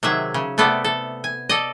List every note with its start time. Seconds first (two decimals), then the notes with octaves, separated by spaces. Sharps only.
0.03 C3 D#3 F#3 G#4 E5
0.34 C#3
0.58 C3 A3 B3 A4 D5
0.84 A4
1.24 G#5
1.49 A4 D5 D#5